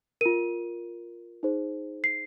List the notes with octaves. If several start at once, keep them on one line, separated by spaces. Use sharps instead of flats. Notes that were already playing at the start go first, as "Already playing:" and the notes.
F4 A#4 D#7
D#4 G#4 C5
C7